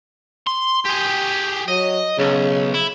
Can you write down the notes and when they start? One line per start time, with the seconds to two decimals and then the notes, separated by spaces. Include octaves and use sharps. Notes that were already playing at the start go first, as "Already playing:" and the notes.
0.47 C6
0.86 G4 G#4
1.68 F#3 D#5
2.18 B1 C#3
2.74 E4